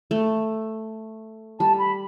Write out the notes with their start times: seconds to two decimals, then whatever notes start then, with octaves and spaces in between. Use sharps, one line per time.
0.11 A3
1.60 G3 A5
1.79 B5